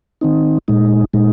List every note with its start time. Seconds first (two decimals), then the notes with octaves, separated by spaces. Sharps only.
0.21 D#3 C4 D#4
0.68 A#2 G#3 D#4
1.14 A#2 G#3 D#4